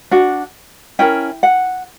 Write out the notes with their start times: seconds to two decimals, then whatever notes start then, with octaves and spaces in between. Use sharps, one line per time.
0.11 D4 F#4
0.99 C#4 E4 A#4 G5
1.43 F#5